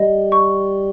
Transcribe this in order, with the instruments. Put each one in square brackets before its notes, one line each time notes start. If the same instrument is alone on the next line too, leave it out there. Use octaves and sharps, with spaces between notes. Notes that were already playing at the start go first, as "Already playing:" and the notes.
Already playing: [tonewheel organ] G3 [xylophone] D#5
[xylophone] C#6